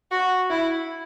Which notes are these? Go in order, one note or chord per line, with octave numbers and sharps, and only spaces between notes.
F#4
E4